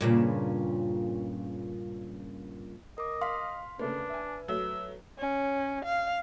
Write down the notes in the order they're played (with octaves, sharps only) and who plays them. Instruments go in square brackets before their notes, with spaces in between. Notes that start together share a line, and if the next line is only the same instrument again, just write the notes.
[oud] G2 A#2 C#3
[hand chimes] A#4 D6 [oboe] D#5
[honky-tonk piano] F5 [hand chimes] C6 B6
[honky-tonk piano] C#3 A3 A#3 [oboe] D4 [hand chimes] B4
[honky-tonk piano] E5 G#5
[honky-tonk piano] F#3 A3 [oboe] E6
[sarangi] C#4
F5